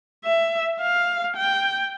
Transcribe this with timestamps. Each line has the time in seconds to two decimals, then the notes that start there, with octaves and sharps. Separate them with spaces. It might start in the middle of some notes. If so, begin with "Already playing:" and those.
0.25 E5
0.81 F5
1.37 G5